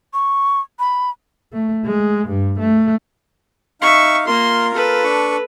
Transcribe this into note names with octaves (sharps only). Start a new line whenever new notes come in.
C#6
B5
A3
G#3
G2
A3
D#4 E5 F5 C#6
A#3 F4 A#4 C6
A4 B4
D4 C#6